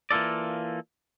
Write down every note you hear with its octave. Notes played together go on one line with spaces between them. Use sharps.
E3 A#3 F4 A4 D5